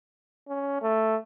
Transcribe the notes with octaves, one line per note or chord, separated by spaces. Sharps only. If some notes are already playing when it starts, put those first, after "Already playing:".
C#4
A3